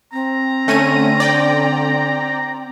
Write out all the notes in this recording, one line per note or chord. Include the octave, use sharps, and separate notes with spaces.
C4 A#5
D3 A3 C#4 D#7
D5 G5